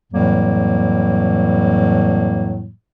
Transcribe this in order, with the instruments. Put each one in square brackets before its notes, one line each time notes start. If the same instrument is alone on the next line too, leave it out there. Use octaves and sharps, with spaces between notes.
[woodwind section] F2 A2 E3 F#3 G3 A#3